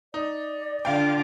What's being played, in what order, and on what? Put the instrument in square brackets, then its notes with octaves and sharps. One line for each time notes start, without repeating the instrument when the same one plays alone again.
[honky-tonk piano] D#4 [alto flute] D5
[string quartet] D3 F4 D6 [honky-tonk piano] F5 G5